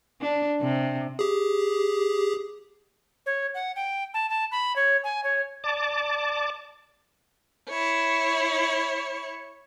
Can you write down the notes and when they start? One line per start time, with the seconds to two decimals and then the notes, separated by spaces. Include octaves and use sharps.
0.22 D4
0.62 C3
1.19 G4 G#4
3.26 C#5
3.54 F#5
3.76 G5
4.14 A5
4.30 A5
4.52 B5
4.76 C#5
5.04 G#5
5.24 C#5
5.64 D5 A5 D6
7.69 E4 C#5